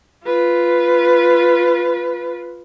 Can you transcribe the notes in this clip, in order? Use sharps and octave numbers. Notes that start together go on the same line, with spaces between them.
F4 B4